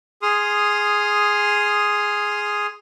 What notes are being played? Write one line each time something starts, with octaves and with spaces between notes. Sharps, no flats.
G#4 C6 D#6 F6